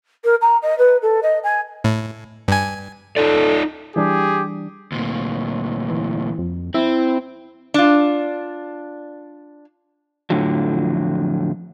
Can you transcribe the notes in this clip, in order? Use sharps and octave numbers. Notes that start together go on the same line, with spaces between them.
A#4
A#5
D#5
B4
A4
D#5
G#5
A2
G2 G#5
D#4 F4 A4 D5
E3 G3 D4 G4 G#4
D2 A#2
E3
F2
C4 E4
D4 F4
F2 A2 D3 F3 F#3